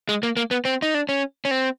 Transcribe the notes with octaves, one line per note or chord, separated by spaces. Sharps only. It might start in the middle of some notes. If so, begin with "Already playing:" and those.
G#3
A#3
A#3
B3
C4
D#4
D4
C#4
C#4
C4